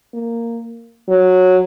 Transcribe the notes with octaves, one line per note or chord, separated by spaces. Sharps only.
A#3
F#3